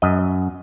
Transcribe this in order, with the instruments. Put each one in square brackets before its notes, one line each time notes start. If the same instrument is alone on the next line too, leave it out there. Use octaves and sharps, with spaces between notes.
[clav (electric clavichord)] F#2 D#5